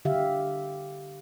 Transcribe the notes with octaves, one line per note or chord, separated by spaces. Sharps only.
D3 G4 E5 F5